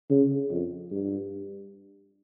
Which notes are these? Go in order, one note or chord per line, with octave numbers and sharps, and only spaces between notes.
C#3
F2
G2